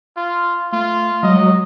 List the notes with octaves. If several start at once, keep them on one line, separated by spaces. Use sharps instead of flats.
F4
A3 F4
F#3 G#3 D#5